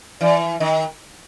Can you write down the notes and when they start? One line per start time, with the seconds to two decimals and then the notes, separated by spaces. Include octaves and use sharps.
0.21 E3 D5
0.60 D#3 D#5